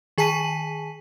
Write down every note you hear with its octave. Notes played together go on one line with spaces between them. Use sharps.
D#3 G#4 G#5 A5 B6 D#7